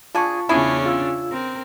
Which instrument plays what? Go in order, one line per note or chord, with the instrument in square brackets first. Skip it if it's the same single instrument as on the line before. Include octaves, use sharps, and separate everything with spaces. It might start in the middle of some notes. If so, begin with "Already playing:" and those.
[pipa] D4 G#4 [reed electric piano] F4 A5 C#6
[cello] E2 C#3 [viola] C#4 D4 [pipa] E4 G#4
[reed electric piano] F4 E6
[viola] C4 [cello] A#4